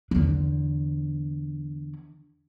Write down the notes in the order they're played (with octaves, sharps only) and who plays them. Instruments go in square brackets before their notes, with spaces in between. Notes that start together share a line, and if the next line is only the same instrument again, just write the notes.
[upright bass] E2 D3